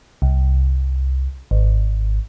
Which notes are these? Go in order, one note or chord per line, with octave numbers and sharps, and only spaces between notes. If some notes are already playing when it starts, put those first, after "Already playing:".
C2
G#1